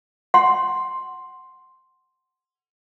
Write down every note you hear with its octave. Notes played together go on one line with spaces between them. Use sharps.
F#5 C6